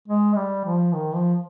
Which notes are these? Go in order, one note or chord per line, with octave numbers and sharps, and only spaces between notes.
G#3
G3
F3
D#3
F3